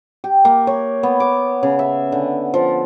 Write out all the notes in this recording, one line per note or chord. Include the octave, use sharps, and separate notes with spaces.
G4
A#3
C#5
B3
D6
C#3
E5
D3
F3